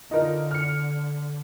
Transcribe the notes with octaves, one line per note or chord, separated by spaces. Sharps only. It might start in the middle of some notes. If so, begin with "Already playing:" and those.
D3 D#4 F4 A#4
F6 C#7